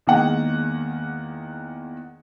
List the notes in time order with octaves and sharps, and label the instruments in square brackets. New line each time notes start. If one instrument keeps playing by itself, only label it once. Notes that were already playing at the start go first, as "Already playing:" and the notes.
[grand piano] E2 D#3 G#3 A#3 D#5 F#5